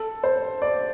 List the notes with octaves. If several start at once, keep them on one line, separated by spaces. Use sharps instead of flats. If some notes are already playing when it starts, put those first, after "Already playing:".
Already playing: A4
C5
D5